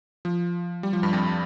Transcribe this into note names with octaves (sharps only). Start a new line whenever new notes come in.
F3
G3
F3
G2
F2